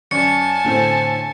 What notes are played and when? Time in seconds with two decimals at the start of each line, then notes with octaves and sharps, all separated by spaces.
0.11 F#2 D5 G#5 A5 C#6 C#7
0.65 A2 D3 C4